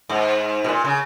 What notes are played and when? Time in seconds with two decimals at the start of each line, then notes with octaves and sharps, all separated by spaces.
0.09 G#2
0.64 B2
0.69 A#2
0.85 C#3